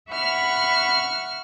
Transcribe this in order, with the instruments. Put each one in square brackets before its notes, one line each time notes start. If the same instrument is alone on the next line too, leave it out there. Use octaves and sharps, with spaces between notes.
[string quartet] E5 F#5 B5 C#6 F6